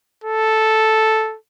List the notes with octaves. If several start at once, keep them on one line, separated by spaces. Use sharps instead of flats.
A4